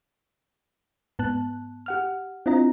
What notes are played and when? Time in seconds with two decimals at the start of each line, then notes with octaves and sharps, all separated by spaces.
1.19 G#2 B3 A5 F#6
1.86 G4 F#5 F6
2.46 C4 D4 E4 F4 D#5 A#5